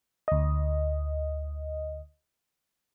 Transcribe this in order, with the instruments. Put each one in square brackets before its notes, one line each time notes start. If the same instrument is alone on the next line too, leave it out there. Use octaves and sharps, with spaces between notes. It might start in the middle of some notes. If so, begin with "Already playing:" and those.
[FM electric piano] D2 D#5